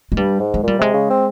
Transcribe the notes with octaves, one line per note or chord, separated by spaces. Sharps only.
G#3
G2 G3
G#2
G#3
A#2 G3
C3 G#3
C#3
C4